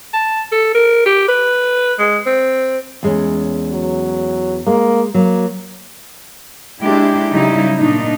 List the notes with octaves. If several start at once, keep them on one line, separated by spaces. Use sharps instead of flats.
A5
A4
A#4
G4
B4
G#3
C4
E2 G#3 C#4
F#3
G#3 A#3
F#3 A#3
G#3 D4 E4 G4
C#3 F#3 G3 D#4 E4
A#2 A3 D4 D#4